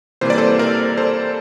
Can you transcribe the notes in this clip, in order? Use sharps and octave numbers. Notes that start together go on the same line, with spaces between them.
C3 E3 G3 A#3 C5
D5
A4 C5
A#4 D5
A4 C5